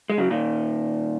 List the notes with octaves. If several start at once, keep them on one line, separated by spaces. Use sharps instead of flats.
G#3
C#3 F#3
A#2 D#3